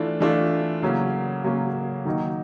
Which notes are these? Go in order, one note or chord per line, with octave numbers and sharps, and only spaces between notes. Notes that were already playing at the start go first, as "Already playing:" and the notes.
Already playing: E3 A3 D4 F4
E3 A3 D4 F4
C#3 F#3 A#3 C#4
C#3 F#3 A#3 C#4
D#3 F#3 A#3 D#4